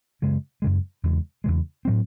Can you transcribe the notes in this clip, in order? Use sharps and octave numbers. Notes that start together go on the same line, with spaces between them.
F#2 C#3 G#3
F#2 C#3 G#3
E2 C#3 G#3
E2 C#3 G#3
A2 F#3 C4